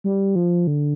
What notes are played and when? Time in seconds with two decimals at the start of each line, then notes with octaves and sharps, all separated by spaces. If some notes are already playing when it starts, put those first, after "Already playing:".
0.04 G3
0.35 F3
0.67 D3